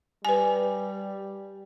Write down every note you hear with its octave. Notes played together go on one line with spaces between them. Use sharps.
G3 B4 G#5